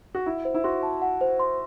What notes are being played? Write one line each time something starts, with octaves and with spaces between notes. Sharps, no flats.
F#4
E4 F#5
C5
E4
F#4 C6
A5
F#5
C5
C6